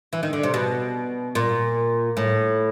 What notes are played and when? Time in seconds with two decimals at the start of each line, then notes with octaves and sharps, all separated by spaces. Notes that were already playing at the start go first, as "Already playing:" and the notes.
0.13 E3
0.23 D#3
0.33 D3
0.43 C3
0.54 B2
1.35 A#2
2.17 A2